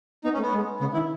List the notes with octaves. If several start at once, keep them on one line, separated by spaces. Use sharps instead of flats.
B3 D#4
C#4
A3
B3
G#3
C#3 B3
D#3 E4